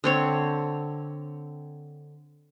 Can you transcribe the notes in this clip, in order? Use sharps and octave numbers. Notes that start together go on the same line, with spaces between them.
D3 C4 C#5